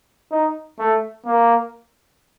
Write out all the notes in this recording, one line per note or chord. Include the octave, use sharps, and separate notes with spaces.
D#4
A3
A#3